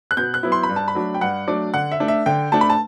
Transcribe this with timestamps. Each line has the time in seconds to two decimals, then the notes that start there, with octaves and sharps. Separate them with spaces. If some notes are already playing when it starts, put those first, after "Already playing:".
0.11 F#6
0.17 B2 G6
0.34 F#6
0.43 F#3 B3 E4
0.52 C6
0.63 B5
0.69 G2
0.76 A5
0.88 B5
0.95 F#3 A3 D4
1.14 G5
1.21 G2 F#5
1.47 F#3 A3 D4 D5
1.74 D3 F#5
1.91 E5
2.00 A3 D4
2.08 E5
2.26 D3 G5
2.52 A3 D4 A5
2.61 B5
2.70 A5